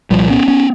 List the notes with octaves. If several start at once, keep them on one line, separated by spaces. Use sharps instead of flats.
C2 A#2 F3 G3
B3 C#4
B3 C#4